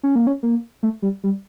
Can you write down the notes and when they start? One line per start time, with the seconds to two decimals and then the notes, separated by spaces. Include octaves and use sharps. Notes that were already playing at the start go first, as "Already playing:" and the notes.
0.03 C#4
0.16 A#3
0.27 C#4
0.43 A#3
0.83 A3
1.02 G3
1.24 G3